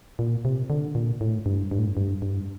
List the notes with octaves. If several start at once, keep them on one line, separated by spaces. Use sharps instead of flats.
A#2
C3
D3
A#2
A2
G2
G2
A2
G2
G2
G2